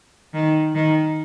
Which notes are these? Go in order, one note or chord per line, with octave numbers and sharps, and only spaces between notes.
D#3
D#3